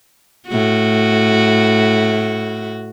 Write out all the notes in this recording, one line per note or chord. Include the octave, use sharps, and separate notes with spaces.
A2 F#4